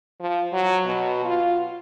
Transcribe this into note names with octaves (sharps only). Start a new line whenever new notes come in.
F3
F#3
B2
F4